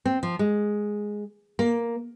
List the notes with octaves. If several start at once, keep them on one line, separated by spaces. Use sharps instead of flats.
C4
F3
G#3
A#3